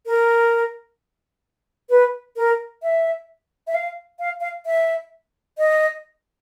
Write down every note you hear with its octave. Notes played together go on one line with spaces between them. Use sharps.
A#4
B4
A#4
E5
E5
F5
F5
F5
E5
D#5